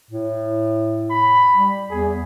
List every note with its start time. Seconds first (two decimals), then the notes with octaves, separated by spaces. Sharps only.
0.11 A2
1.11 B5
1.55 G3
1.91 E2 G#4